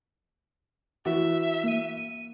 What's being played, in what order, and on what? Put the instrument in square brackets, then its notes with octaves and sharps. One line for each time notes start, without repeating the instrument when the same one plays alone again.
[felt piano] E3 F#4 [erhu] E5
[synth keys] A#3 D#7